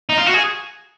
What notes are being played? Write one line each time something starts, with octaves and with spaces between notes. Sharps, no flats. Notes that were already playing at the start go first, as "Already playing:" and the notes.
D#4
F4
F#4
G#4